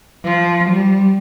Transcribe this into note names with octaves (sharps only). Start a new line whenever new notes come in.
F3
G3